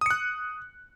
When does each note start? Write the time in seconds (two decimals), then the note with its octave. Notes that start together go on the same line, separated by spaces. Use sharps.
0.01 D#6
0.06 C#7
0.11 F#6